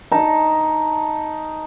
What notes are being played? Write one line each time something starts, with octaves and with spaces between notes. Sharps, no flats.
D#4 A5